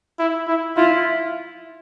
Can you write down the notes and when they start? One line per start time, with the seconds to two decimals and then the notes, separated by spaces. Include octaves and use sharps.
0.19 E4
0.47 E4
0.77 E4 F4